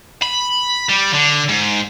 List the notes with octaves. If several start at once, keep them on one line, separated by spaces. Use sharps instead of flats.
B5
G3
D3
G#2